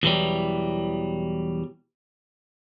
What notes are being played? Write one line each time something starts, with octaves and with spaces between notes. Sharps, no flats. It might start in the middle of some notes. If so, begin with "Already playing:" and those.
E2 B2 E3 F#3 G3